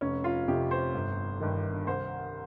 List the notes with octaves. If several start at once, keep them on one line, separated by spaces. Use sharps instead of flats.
F1 C#4
F4
F2 C3 G4
C5
G1
G2 D#3
C2 C5